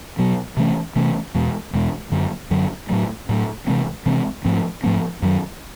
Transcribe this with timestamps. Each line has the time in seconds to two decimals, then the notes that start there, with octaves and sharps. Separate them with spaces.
0.19 B2 F#3 B3
0.57 C3 E3 A3 C#4
0.96 C3 E3 A3 C#4
1.34 E2 B2 G#3
1.73 E2 B2 G#3
2.11 F#2 D3 F#3
2.51 F#2 D3 F#3
2.89 A2 F#3 A3
3.29 A2 F#3 A3
3.67 C3 E3 G#3 C4
4.06 C3 E3 G#3 C4
4.44 G#2 F3 A3 C4
4.83 G#2 F3 A3 C4
5.22 F#2 D#3 F#3